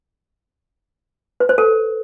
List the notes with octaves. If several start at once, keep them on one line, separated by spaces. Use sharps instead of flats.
B4
C5
A4